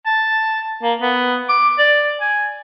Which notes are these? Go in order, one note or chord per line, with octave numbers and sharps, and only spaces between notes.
A5
A#3
B3
D6
D5
G#5